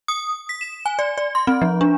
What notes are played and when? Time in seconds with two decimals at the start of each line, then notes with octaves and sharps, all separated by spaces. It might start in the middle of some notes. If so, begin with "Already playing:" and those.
0.08 D#6
0.49 B6
0.61 E7
0.86 G#5
0.99 D5
1.18 D5
1.35 C6
1.47 C4
1.62 F3
1.81 D4